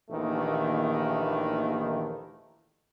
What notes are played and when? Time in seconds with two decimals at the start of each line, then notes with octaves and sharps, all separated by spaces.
0.10 A#1 D#2 D#3 E3 A3